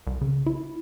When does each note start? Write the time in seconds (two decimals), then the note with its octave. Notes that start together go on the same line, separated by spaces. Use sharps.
0.07 C2
0.21 C#3
0.46 E4